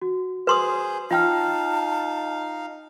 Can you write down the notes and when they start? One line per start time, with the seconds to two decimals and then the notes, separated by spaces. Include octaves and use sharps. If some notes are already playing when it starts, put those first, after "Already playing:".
0.02 F#4
0.47 G#4 B4 C5 C6 D#6
1.11 D#4 F4 F5 G5 A5 F6